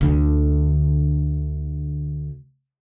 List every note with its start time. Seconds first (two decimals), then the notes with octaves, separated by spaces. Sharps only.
0.01 D2 D3